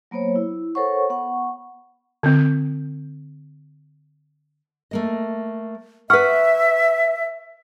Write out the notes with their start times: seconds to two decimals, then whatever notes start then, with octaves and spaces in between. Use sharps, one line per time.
0.11 F#3 A#3 B3 C5 C#5
0.36 E4
0.75 A4 A#4 C5 C#5 F#5 C#6
1.10 B3 F#5 C#6
2.23 D3 C4
4.91 A3 A#3 D#5
6.10 B4 E5 F#5 C#6 F6